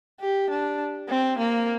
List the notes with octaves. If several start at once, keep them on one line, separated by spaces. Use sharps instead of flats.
G4
D4
C4
A#3